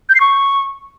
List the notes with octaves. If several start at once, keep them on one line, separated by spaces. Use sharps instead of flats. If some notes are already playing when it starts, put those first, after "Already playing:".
G6
C7
C#6